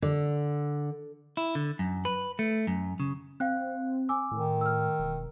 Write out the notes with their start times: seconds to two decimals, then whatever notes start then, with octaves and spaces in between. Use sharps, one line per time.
0.02 D3
1.37 E4
1.55 D3
1.79 F#2
2.05 B4
2.39 A3
2.67 F#2
3.00 C#3
3.40 C4 F5 G5 F#6
4.09 G#5 D6 E6
4.32 A2 D#3
4.61 E6 F6
4.99 E1